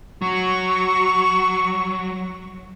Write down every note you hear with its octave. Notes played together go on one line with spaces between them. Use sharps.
F#3 C#6